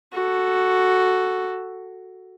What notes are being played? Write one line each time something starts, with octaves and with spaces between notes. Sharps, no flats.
F#4 A4